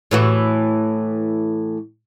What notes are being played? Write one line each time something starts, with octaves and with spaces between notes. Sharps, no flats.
A2 E3 F#4